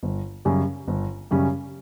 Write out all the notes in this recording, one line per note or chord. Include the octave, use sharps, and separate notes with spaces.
G1
F#2 C#3 G3 C#4
G1
F#2 C#3 G3 C#4